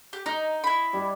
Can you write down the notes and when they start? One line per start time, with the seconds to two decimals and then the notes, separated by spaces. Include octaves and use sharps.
0.13 G4
0.26 D#4 D#5
0.64 E4 B5
0.93 G3 F#5